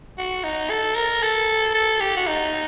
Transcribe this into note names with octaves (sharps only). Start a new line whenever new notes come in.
F#4
D#4
A4
A#4
A4
A4
G4
F#4
D#4